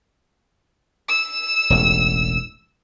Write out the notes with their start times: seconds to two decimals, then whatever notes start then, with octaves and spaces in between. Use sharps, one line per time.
1.08 E6
1.70 E1 A1